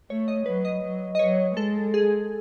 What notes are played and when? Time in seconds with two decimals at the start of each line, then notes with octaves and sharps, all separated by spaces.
0.10 A3 C#5
0.28 D#5
0.46 F#3 B4
0.65 D#5
0.82 F#3
1.15 D#5
1.19 F#3 C#5
1.56 G#3 A4
1.94 G#4